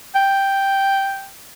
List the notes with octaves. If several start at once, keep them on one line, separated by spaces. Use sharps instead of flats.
G5